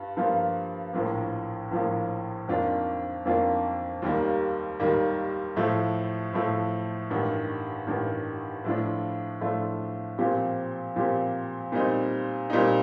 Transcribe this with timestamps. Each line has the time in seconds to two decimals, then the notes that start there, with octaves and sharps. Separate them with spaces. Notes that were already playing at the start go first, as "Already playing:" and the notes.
Already playing: G2 F4
0.17 G2 F3 A#3 F4
0.93 A#1 A2 F3 A#3
1.71 A#1 A2 F3 A#3
2.48 F2 D#3 A#3 D4 F4
3.25 F2 D#3 A#3 D4 F4
4.02 D#2 D#3 G3 A#3
4.80 D#2 D#3 G3 A#3
5.56 A2 F3 A3
6.33 A2 F3 A3
7.10 A1 G2 D#3
7.87 A1 G2 D#3
8.64 A2 F3 A3 D4 F4
9.41 A2 F3 A3 D4 F4
10.18 A#2 F3 C4 G4
10.96 A#2 F3 C4 G4
11.72 A#2 G3 C4 D#4
12.50 A#2 G3 C4 D#4